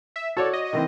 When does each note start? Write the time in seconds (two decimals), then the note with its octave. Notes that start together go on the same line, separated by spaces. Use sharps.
0.16 E5
0.37 F#4 A4 C#5 D5
0.53 D#5
0.73 D#3 E3 C4